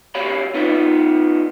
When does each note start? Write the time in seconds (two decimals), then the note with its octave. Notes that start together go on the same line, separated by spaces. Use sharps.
0.15 F#4 G4 C#5 F5 B5
0.54 B3 D#4 F4 B4